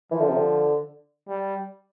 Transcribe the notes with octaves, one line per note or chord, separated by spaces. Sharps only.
E3 F3
D3
C3
D3
G3